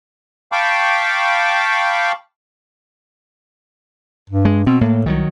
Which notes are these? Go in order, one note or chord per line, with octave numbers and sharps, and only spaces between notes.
F5 G5 A5 B5 C#6 D6
G2
G#3
B2 C4
A2 A#3
C2 D#3 E3 F#3